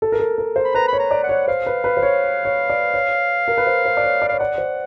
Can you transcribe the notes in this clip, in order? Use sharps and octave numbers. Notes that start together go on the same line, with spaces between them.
A4
A#4
A4
A#4
C5
B5
B4 A#5
C#5 B5
A#5
D5
F#5
C#5
C5 F5
B4
B4
C5
C#5
C#5
D5
C#5
A#4
B4
C5
C5
D5
C#5
D5
C#5 F5
D5 F#5
C5